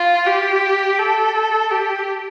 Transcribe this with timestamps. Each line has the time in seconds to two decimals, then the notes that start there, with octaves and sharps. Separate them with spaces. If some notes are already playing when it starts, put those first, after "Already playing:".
Already playing: F4
0.27 G4
0.99 A4
1.71 G4